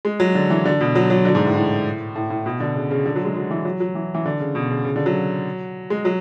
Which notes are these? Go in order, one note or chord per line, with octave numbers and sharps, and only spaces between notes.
G#3
F#3
D3
E3
D3
B2
F#3
F#3
D3
G#2
A2
A2
A2
A2
B2
D3
C#3
C#3
D3
F#3
G#3
F#3
E3
F#3
F#3
E3
E3
D3
C#3
B2
C#3
C#3
D3
F#3
G#3
F#3